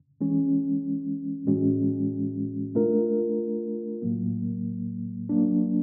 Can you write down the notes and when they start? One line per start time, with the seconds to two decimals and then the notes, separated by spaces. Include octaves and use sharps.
0.21 E3 G#3 C#4
1.47 A2 E3 G#3 C#4 F#4
2.75 A3 D4 F4 A#4
4.02 A2 F#3 A#3
5.29 F#3 A#3 D4